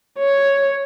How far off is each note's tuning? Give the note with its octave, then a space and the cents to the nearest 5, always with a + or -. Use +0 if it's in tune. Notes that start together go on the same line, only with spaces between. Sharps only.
C#5 +0